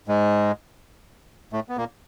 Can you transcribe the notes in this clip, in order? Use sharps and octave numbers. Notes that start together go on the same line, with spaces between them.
G#2 G#3
A2 A3
B3
A#2 A#3